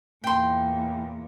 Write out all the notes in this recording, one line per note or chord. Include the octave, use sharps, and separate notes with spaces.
E2 A#2 G5 C6